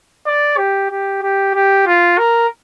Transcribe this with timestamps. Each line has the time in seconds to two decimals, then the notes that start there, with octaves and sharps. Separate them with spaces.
0.26 D5
0.57 G4
0.91 G4
1.23 G4
1.55 G4
1.87 F4
2.18 A#4